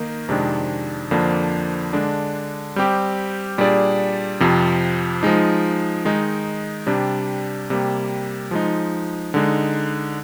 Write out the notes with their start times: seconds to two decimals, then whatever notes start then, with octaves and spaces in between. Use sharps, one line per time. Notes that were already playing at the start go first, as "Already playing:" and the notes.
Already playing: D#3 A#3 D#4
0.28 F2 C3 D#3 G#3 D4
1.11 F2 D3 F3 A#3 D4
1.93 D3 G#3 D4
2.76 G3 C4 G4
3.58 A#2 G3 D4 G#4 D5
4.40 F2 C3 F3
5.23 F3 G#3 D#4
6.05 D#3 G#3 D#4
6.87 C3 G3 D4
7.70 C3 G3 A#3
8.51 F3 G#3 D#4
9.34 D3 G#3 D#4